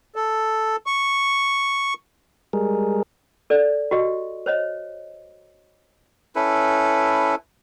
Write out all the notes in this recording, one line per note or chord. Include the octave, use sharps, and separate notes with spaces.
A4
C#6
G3 G#3 G#4 A#4
A4 D5
F#4 G4 D#5
C5 C#5 D#5
C#4 E4 A4 B4